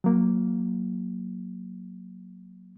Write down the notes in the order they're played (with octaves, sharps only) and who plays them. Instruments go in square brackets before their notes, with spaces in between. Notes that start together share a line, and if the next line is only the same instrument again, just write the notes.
[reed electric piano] F#3 A#3